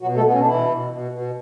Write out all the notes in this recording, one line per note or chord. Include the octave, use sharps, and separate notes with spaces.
B2 F#3 F#4
A3 A4
B2 B3
C#4
D4
B2 E3 E4
B2
B2
B2